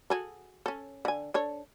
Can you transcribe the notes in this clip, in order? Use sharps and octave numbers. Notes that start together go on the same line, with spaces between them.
F#4 G#4 A4
C#4 A4
D3 G#5
D4 A4 C#5